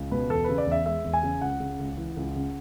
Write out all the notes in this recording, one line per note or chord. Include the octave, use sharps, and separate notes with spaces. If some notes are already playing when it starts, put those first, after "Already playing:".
Already playing: C#2
B2 B4
E2 A4
C#3 B4
D5
E2 E5
G#3 E5
E2
G#5
C#3
C#2 F#5
C#3
C#2
E3
C#2
C#3